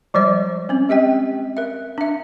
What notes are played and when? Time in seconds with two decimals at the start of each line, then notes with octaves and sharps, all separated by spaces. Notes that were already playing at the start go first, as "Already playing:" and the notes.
0.14 F3 G3 G#3 C5 D5
0.69 C4 C#4
0.89 G#3 G4 D#5 G5
1.57 A#4 E5
1.98 D4 E5